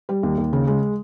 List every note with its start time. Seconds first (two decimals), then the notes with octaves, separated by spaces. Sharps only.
0.09 G3
0.23 D#2
0.38 D#2
0.53 C#3
0.67 G#3